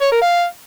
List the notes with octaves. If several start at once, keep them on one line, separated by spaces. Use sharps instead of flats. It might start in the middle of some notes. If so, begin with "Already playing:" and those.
C#5
A#4
F5